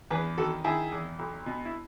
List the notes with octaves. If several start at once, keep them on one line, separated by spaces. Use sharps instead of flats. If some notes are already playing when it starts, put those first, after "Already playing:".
E2 G#4 B4
D#3 F#4 A4
D#3 E4 G#4
E2
B1
B2
E4